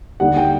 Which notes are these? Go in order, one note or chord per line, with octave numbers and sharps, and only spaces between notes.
D#2 D3 G3 F#5
G5